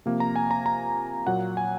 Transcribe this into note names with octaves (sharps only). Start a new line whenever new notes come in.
C3 F3 A#3
A#5
G#5
A#5
A#5
A#2 F#3 A#3 F#5
G#5